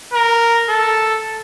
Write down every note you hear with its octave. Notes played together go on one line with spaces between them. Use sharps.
A#4
A4